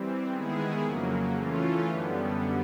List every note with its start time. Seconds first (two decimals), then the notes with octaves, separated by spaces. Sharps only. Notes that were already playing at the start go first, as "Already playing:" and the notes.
Already playing: E3 G3 C4
0.32 D#3 G#3 B3 E4 G#4
0.84 F2 C#3 F#3 A#3
1.36 E3 A3 C#4 F4
1.87 F#2 D3 G3 B3